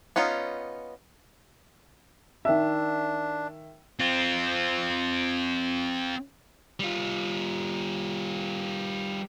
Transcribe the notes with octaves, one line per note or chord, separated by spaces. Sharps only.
B3 C#4 D#4 F4
D#3 D4 E5
C4 F4
G3 F4